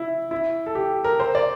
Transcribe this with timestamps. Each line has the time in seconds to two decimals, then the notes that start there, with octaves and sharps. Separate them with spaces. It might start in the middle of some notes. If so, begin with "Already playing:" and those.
Already playing: E4
0.31 E4
0.66 A4
0.75 G4
1.04 A#4
1.20 C5
1.35 D5